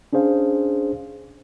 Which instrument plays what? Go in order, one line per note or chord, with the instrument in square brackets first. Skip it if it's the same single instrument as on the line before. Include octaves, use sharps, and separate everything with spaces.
[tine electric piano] C#4 D4 G#4 C5 F5